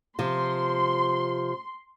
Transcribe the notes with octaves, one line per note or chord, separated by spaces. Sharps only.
C3 F3 C6